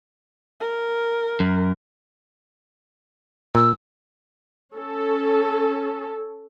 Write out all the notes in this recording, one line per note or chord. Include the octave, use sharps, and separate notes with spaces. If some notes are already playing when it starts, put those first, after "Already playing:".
A#4
F#2
A#2 E6
C#4 A4